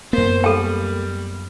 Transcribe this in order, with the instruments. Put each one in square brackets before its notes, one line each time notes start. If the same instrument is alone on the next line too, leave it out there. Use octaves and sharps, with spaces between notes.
[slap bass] F#2 B3 [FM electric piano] A#3 [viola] C5
[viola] G3 [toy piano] A4 G5